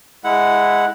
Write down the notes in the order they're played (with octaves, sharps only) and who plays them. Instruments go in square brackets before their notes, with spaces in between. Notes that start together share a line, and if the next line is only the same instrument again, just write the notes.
[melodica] G#3 E4 F#5